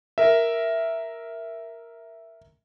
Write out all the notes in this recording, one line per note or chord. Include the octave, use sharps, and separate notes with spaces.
A#4 E5